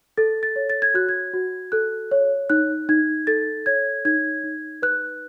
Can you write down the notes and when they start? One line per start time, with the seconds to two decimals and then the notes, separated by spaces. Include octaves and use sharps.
0.17 A4 A6
0.43 A6
0.56 C#5
0.70 A6
0.82 G#6
0.94 F#4 F#6
1.09 G#6
1.34 F#4
1.72 A4 F#6
2.11 C#5
2.50 D#4 F#6
2.89 D#4 G#6
3.27 A4 A6
3.66 C#5 G#6
4.05 D#4 G#6
4.44 D#4
4.82 B4 F#6